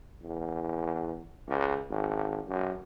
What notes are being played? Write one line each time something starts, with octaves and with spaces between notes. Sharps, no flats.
E2
C#2
G#1
F#2